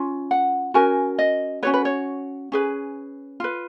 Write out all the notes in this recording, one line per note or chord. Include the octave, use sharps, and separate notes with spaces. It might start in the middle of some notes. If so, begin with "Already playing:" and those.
Already playing: C#4 F4
F#5
C#4 F#4 A#4 G#5
D#5
C#4 F#4 B4 C#5
B4
C#5
C#4 G#4 B4
F4 B4